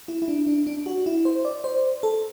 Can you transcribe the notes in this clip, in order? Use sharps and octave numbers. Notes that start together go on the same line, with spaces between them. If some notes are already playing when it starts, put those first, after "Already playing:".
E4
E4
D4
D4
D4
F#4
E4
C5
D5
C5
A4